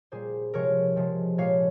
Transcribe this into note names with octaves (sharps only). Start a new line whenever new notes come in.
A#2 G3 G#4 C5
C3 F3 G#3 A#4 C#5
C3 F3 G#3
A#2 F3 G#3 C#5 F5